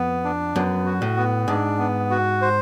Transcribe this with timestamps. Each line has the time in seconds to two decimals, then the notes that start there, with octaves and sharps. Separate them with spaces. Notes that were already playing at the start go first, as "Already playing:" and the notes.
Already playing: F2 B3
0.25 D4
0.55 F#2 B3
0.86 F#4
1.02 A2
1.17 B3
1.48 G#2 D4
1.79 B3
2.11 F#4
2.42 C5